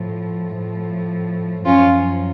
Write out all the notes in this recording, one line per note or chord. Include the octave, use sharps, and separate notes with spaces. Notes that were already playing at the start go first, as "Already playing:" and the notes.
Already playing: A2 F3
A2 F3
F#2 F3 C#4 F4